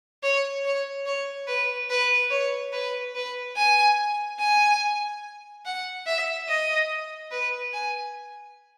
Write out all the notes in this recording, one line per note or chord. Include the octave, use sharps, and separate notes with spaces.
C#5
C#5
C#5
B4
B4
C#5
B4
B4
G#5
G#5
F#5
E5
D#5
B4
G#5